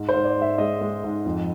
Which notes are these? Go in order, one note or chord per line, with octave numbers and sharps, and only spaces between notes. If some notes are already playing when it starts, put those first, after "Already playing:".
Already playing: G#2
C5
G#2
D5
G#2
E5
G#3 D#5
G#3
G#2
F2